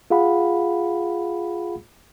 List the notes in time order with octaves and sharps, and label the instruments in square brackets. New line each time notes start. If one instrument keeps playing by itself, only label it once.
[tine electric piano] F4 G#4 F5 F#5 B5